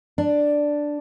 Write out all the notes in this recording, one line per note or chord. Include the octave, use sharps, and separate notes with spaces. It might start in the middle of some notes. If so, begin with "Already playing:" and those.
D4